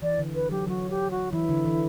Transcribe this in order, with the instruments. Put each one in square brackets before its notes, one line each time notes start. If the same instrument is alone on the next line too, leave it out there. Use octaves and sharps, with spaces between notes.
[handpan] E3 [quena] D5
[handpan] D3
[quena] B4
[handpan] F#3 [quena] G4
[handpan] F#3 [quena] F#4
[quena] G4
F#4
[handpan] E3 [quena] E4
[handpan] D3
E3